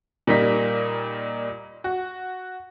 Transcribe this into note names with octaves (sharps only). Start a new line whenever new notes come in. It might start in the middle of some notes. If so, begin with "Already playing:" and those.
A#2 G3 A#3 D#4 B6
F#4